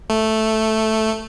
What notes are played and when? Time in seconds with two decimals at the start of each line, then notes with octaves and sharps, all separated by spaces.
0.10 A3